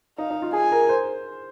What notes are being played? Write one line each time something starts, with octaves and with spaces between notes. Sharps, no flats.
D#4 F5
D#4
F4
G#4 G#5
A#4
C5